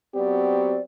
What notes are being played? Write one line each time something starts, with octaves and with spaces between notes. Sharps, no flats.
F#3 B3 C4 G4 D5